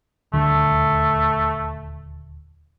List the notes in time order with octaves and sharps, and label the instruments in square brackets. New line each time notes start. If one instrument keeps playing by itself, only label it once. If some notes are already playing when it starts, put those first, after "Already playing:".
[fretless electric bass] D#1 D2 D3 [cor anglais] A3